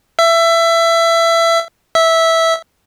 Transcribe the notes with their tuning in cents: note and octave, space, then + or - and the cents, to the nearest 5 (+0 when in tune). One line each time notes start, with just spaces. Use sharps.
E5 +20
E5 -10